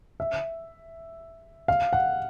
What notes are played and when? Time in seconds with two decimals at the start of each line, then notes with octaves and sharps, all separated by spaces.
0.20 E5
1.68 F5
1.93 F#5